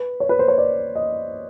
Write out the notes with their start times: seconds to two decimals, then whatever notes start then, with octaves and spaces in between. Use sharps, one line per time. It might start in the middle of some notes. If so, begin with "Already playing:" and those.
Already playing: B4
0.20 C#5
0.29 B4
0.39 C5
0.48 C#5
0.58 D5
0.95 D#5